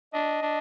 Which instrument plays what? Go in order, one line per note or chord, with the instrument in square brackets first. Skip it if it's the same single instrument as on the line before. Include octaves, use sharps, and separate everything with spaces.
[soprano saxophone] D4 [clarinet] D#5
[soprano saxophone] D4